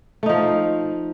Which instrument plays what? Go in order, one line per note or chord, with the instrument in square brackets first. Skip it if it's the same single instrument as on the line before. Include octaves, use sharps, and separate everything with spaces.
[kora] A3
D#4
F3